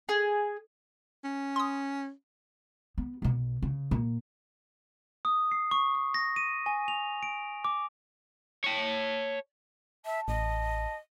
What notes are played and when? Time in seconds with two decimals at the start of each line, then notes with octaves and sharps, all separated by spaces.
0.09 G#4
1.25 C#4
1.56 C6 D#6
2.98 B3
3.22 B1 B2
3.62 C#3
3.91 A#2
5.25 D#6
5.52 C7
5.71 C#6
5.95 C#6
6.14 A#6
6.36 D#7
6.66 G#5
6.88 F7
7.23 D7
7.65 D6
8.64 C#5 A5
10.05 E5 A5
10.28 A1 D#5